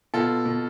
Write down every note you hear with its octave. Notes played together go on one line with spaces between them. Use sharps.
B2 F4 A4
B2